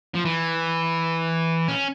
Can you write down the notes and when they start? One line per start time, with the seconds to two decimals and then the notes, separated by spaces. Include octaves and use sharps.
0.15 F3
0.25 E3
1.68 C#4